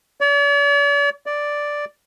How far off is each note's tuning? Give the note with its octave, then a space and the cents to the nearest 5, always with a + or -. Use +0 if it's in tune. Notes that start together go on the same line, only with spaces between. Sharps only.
D5 -45
D5 +0